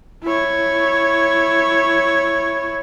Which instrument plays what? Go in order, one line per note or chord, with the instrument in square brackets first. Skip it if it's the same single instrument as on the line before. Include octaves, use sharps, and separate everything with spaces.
[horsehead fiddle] E4 C#5